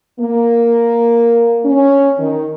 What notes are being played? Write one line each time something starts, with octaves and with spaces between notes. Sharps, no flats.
A#3
C#4
D#3